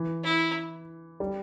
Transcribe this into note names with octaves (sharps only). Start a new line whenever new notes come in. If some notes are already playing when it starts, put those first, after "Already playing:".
Already playing: E3
E4
G3